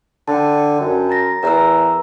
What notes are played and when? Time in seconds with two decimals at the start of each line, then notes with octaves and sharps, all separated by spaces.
0.28 D3 G5 A5
0.81 F#2
1.09 A#5 A6 A#6
1.43 E2 A#4 A#5 E6